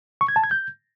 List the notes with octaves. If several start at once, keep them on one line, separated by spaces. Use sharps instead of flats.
C#6
G#6
A5
G#6
G6